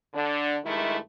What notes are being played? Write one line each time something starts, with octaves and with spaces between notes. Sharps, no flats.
D3 D4
G2 D#3 G#3 A3 E4